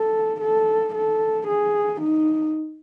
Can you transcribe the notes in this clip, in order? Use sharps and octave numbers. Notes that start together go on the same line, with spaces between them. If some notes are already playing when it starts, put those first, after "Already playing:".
Already playing: A4
A4
A4
G#4
D#4